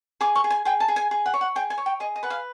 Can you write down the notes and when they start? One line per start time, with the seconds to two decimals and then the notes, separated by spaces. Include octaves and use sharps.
0.21 G#4 D6
0.35 C#6
0.44 G#4
0.50 G#5
0.65 G#4 G5
0.80 A5
0.88 G#4
0.96 G#5
1.11 G#4
1.26 F#5
1.34 C#5
1.41 F#5
1.55 G#4 G5
1.70 G#5
1.78 C#5
1.86 G5
2.00 G#4 D#5
2.16 D#5
2.23 B4 F#5
2.30 F5